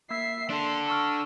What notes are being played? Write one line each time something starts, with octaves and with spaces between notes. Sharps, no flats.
A#3 E5 E6 B6 C7
D4 A4 C6
A5 C#6 E6 F6